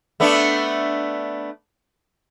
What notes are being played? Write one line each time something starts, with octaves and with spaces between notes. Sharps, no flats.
A3 B3 D4